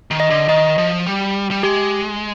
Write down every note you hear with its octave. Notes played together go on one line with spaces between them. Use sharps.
D#3
D#5
D3
D#3 D#5
F3
G3
G3
G#3 G4